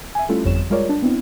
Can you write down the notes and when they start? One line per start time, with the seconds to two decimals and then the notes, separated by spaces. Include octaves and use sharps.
0.15 E5 G#5
0.29 G3 A3 C#4 E4 F4 A4
0.44 G1 F2 G3 C#5 E7
0.70 G3 G#3 F4 A#4 C#5 D5
0.89 D4
1.02 B3 C4 D4 E4